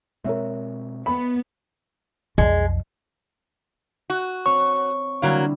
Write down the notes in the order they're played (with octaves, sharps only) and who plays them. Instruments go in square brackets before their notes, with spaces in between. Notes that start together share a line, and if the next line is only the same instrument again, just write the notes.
[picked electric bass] B2 G#3 C4 [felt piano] A#4 C#5 E5
[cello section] B3 [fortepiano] B5
[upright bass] B1 F2 [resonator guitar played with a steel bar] G#3
[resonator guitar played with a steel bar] F#4
[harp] C4 C#5 [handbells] C#6
[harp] D3 G3 E4 [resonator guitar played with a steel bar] F#3 A#3 F5